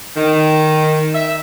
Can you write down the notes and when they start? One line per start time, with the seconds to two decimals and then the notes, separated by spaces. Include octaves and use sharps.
0.17 D#3
1.15 E5